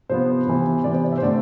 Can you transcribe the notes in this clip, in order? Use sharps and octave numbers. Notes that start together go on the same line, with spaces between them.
C3 F3 B3 C5
C3 E3 B3
C3 E3 B3 D5
C5
D5
E5
C5
D3 A3 C4 D5